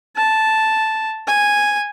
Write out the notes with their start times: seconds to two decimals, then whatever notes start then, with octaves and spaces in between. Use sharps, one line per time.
0.16 A5
1.27 G#5